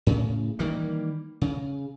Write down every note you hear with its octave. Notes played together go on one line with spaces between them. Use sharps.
A2 C#3
D#3 E3 G3 A#3
C#3